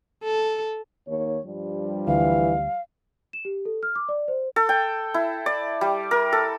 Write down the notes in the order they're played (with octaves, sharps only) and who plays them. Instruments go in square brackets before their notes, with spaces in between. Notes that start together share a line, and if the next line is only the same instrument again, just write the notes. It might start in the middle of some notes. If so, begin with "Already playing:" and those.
[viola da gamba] A4
[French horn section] D#2 C#5
G2 F3 G3
[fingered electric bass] D2 [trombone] E3 [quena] F5
[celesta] E7
G4
A4
F6
D6
D5
C5
[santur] A4
G5
E4
D5
G3
A#4
A4